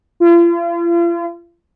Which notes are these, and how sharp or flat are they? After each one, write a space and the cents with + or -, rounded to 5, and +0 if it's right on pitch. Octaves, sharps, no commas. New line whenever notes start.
F4 -40